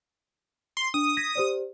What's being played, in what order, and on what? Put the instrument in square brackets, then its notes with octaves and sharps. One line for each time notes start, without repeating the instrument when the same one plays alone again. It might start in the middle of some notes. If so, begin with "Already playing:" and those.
[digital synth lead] C6
[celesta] D4 [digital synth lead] D#6
[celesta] G#6 A#6 B6
G4 C5 D5